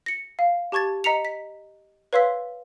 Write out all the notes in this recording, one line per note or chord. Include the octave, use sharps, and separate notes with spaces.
A#6 C#7
F5
G4 A5 C#6 G#6 A6
D#5 A#5 B6 C#7 F7
B6
B4 C#5 F5 C6 E6 B6